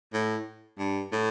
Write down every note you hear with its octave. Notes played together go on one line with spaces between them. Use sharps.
A2
G2
A2